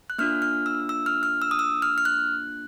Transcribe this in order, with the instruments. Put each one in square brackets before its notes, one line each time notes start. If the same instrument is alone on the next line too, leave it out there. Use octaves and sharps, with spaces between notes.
[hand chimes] F#6
A#3 D4 F4 F6
F6
E6
E6
F6
F6
E6
D#6
E6
F6
F6
F#6